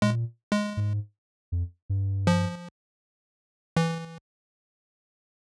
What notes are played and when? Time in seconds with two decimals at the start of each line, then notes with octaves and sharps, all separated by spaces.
0.02 A#2 G#3
0.52 G#3
0.77 G#2
1.52 F2
1.90 G2
2.27 F3
3.77 E3